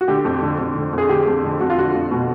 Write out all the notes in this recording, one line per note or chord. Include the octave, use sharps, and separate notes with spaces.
F#4
D3 G4
F2
D3
F2
D3
F2 G#4
D3 G4
F2
D3
F2 F#4
F4
D3 F#4
F2
B2